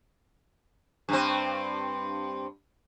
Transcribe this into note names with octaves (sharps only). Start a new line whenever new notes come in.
G2 C4